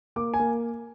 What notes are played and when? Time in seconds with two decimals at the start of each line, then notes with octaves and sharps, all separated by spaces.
0.16 A#3 D6
0.34 G#5
0.39 A#3